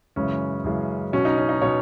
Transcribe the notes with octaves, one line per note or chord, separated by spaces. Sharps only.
F#2 C#3 E3 G#3 C#4
F#2 C#3 E3 G#3
B2 F#3 C#4
D#4
C#4
D#4
B2 F#3 C#5